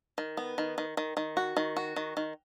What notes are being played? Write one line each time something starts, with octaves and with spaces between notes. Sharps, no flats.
D#3
B3
D#3
D#3
D#3
D#3
F#4
D#3
F#4
D#3
D#3